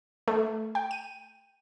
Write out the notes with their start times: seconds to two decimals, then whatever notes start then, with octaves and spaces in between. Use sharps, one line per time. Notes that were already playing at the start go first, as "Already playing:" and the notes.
0.28 A3
0.75 G5
0.91 D#7